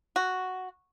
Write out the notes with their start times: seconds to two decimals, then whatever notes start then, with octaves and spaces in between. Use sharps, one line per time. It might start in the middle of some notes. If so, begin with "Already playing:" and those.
0.16 F#4